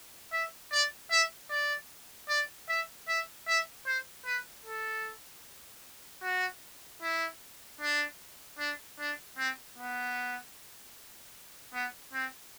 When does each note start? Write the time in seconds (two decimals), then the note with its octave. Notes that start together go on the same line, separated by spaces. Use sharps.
0.32 E5
0.72 D5
1.11 E5
1.50 D5
2.28 D5
2.69 E5
3.08 E5
3.48 E5
3.86 C5
4.26 B4
4.65 A4
6.22 F#4
7.02 E4
7.81 D4
8.59 D4
8.99 D4
9.37 C4
9.78 B3
11.74 B3
12.13 C4